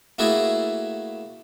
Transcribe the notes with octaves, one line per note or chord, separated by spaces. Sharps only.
A3 A#3 E4 F#4 G#4 A4